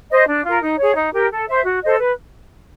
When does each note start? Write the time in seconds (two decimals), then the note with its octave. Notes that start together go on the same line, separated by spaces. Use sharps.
0.11 C5 D#5
0.28 D4
0.45 F4 A#4
0.62 D#4
0.79 G#4 C#5
0.96 D#4
1.13 G4 A#4
1.31 A4
1.48 C5 E5
1.65 F#4
1.82 A4 C5 D#5
1.99 B4